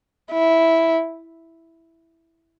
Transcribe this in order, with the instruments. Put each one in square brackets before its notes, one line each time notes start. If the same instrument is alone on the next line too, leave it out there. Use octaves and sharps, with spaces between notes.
[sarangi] E4